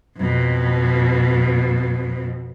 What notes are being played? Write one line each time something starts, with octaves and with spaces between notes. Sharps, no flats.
F2 B2